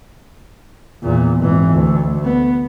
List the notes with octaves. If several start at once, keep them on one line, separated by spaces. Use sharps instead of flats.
E2 A#2
G#1 E3
D2
B3